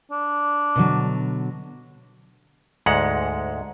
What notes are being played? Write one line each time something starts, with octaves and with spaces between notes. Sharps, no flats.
D4
B2 D3 F#3
D2 G#2 G#3 F#5